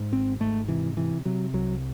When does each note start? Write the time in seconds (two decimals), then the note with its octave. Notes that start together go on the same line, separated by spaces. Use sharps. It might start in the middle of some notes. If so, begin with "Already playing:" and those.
Already playing: G#2
0.12 G#1 C4
0.40 G#2 A3
0.68 C3 E3
0.97 C3 E3
1.25 C3 F#3
1.53 C2 F#3